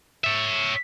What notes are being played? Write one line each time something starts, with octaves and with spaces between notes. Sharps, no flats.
C#5 E5